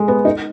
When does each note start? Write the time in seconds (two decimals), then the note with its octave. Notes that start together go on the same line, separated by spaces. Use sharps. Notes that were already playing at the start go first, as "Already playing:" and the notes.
Already playing: G#3
0.08 B3
0.25 D#4